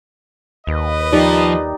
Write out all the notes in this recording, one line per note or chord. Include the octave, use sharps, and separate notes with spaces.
D#2 B4 D#5
F3 D#4 G4 D5